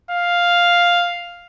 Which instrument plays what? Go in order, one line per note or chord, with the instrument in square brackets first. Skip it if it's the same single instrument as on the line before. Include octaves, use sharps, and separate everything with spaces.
[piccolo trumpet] F5